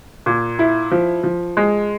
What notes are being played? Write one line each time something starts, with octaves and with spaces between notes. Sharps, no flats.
A#2
E4
F3
F3
G#3